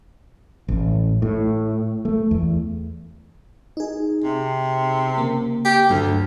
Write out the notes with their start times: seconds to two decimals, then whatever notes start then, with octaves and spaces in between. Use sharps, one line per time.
0.68 A1
1.22 A2
2.05 A3
2.31 E2
3.77 D#4 G#4
4.24 C3
5.18 C#3 A#3
5.65 G4
5.90 D2 G2 F#3